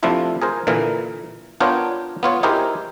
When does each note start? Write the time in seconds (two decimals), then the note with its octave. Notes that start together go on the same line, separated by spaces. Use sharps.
0.03 C3 F3 A3 D4 E4 F4
0.42 G#4 A#4 C5
0.67 A#2 D3 E3 A#4
1.60 B3 D4 F4 A#4 C#5 G5
2.23 B3 F4 C#5
2.43 D#4 E4 G4 G#4 A#4 C5